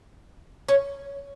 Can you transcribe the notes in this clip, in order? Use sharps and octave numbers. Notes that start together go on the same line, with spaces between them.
C#4